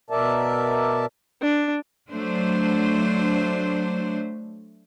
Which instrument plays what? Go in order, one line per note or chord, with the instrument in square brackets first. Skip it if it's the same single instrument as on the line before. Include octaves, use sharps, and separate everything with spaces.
[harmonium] B2 A#4 D5 E5 A5
[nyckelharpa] D4
[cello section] F#3 A3 D4 C5